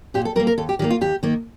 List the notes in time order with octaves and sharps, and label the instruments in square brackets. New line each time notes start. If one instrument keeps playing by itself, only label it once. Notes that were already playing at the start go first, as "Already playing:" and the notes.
[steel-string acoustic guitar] A#2 G4
A4
G3 A#4
A#3
A#4
D#2 A4
G4
D#3 G4
G3 A#3
F4
D#2 G4
D#3 A#3